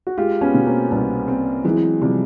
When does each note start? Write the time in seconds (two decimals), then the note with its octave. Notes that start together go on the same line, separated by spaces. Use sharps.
0.07 F#4
0.17 G#3 F4 G4
0.41 B3 C#4
0.54 B2
0.66 A#3 C4
0.91 C2 B3 C#4
1.28 C4
1.64 E3 F#3 G#3
2.01 C3 F3 G3